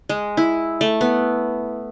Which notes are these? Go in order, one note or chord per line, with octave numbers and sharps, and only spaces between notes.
G#3
E4
A3
B3